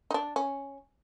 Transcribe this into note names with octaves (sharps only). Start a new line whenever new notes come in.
D#4
D4
C#4